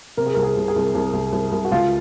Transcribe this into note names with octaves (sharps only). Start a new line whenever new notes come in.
C3 A#4
G#4
C2 A#4
G#4
C2
G#4
C2
C2
C2
C2
C2
F#4
C#2 F4